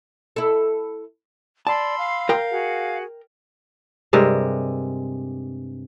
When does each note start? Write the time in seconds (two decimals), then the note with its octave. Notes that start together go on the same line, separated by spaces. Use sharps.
0.36 E4 A4
1.67 D5 A5 B5 C6 E6
1.98 F5
2.29 A#4 G5
2.51 F#4 G#4 F#5
4.13 G2 C3 G#3 A#4